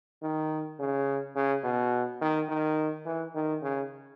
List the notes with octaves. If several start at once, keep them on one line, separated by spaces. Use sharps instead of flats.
D#3
C#3
C#3
B2
D#3
D#3
E3
D#3
C#3